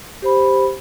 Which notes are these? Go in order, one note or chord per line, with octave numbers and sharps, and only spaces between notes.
G4 C5 B5